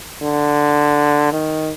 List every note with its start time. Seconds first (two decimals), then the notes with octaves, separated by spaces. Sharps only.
0.22 D3
1.32 D#3